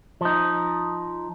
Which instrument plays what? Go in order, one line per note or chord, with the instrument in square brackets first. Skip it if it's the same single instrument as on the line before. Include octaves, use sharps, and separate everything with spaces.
[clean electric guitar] F3 D#4